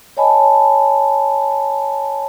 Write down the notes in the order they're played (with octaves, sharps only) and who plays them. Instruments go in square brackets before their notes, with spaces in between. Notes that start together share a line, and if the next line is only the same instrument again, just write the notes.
[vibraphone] C#5 D#5 G#5 A5 B5